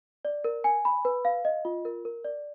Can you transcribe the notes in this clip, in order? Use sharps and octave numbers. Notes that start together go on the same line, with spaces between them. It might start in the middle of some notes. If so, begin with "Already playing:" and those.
D5
A#4
G#5
B5
B4
F5
D#5
F4
A#4
A#4
D5